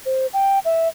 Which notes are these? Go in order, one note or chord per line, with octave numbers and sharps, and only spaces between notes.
C5
G5
E5